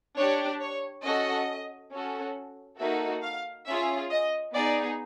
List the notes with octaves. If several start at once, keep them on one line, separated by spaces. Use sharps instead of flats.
D4 G4 C#5
C#5
C#4 F#4 A4 D#5
C#4 F#4 A4
A#3 D#4 F#4 A4 E5
F5
C#4 F4 G#4 E5
D#5
B3 D#4 G#4 D5